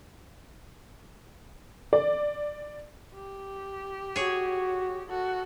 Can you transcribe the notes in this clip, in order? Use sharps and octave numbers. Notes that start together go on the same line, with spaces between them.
D5
G4
F#4 G#4 C#5
F#4 A4